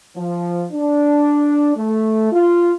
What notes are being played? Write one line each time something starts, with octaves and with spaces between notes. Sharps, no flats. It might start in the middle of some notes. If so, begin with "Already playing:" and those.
F3
D4
A3
F4